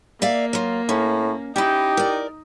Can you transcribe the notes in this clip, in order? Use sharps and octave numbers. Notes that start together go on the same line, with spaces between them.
A#3 D5 E5 F5
F#3 F4
A2 C#4
C#4 D#4 E4 G4
A#4 D5